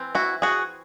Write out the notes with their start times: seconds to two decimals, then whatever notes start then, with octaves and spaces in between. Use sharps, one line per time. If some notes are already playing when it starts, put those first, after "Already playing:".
Already playing: E3 C4
0.15 E4 F#4
0.42 F#4 G#4